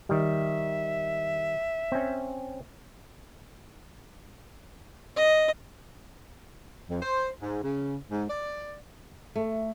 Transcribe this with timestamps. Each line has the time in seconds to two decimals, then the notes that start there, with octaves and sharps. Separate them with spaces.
0.09 D#3 G3 E5
1.92 C4 C#4
5.17 D#5
6.89 F2
7.02 C5
7.40 G#2
7.63 C#3
8.10 G#2
8.30 D5
9.36 A3